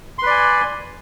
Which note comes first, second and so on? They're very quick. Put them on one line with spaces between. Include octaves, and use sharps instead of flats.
C6 B4 D5 G#5